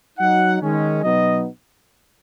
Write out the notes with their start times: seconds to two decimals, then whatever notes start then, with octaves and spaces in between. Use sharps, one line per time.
0.18 F#3 D#4 F#5
0.61 D#3 G#3 C#4
1.03 B2 F#3 B3 D#4 D#5